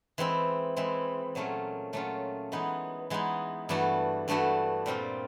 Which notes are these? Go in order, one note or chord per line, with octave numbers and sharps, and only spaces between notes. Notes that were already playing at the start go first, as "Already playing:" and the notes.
E3 G#3 C4 E4
E3 G#3 C4 E4
A#2 F#3 A3 C#4 F4
A#2 F#3 A3 C#4 F4
E3 G#3 B3 D#4
E3 G#3 B3 D#4
G2 E3 A3 D4 F#4
G2 E3 A3 D4 F#4
A#2 G3 C4 F4